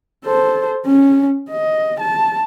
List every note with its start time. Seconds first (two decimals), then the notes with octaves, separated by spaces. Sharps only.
0.25 A4 C5
0.86 C#4
1.49 D#5
2.00 A5